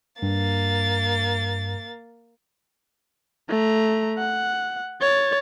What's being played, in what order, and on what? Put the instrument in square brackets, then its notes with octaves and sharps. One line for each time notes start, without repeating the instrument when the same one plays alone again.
[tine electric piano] G2 [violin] A#3 A6
[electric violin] A3 A#5
F#5
C#5 A6